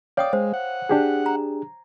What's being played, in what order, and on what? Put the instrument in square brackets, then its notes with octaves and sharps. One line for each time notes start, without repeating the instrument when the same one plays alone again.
[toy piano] C#5 G5 D#6 [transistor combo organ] D5 [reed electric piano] F5
[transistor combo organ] G#3 [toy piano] C5
[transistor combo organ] F#5
[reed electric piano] D4 G4 G#4
[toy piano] A#5